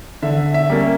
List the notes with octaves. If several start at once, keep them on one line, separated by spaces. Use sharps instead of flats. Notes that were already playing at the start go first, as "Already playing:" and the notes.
D3 E5
E5
G3 A#3 C#4